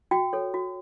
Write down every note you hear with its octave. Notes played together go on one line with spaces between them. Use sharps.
F#4 G5
A4 C#5
F#4